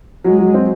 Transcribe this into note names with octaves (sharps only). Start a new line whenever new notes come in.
F#3 G#3
F#3
C4